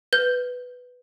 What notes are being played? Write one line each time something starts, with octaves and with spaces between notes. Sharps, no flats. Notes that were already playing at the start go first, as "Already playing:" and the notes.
B4 G6 G7